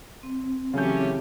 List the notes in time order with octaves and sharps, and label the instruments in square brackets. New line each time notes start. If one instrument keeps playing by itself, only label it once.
[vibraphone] C4
[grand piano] C#3 G6 [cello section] E3 G4 [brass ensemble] F#3 A3 C#4